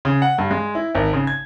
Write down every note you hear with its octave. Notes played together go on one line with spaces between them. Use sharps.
C#3
F#5
G2
G#3
E4
G#1
C#3
G#6